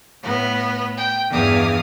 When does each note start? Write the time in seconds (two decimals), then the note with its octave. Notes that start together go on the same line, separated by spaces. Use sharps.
0.22 A2 B3
0.97 G5
1.30 E2 G2 F5 D#6